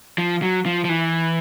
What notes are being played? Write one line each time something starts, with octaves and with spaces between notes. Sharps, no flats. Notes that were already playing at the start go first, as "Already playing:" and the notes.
F3
F#3
F3
F3
E3